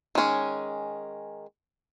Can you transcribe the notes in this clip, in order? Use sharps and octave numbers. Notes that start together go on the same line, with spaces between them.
D#3 G#3 C#4